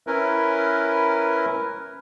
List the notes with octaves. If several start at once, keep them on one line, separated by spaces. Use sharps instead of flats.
C#4 E4 A#4 B4